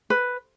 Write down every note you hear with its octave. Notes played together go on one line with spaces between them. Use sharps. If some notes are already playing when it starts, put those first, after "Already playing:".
B4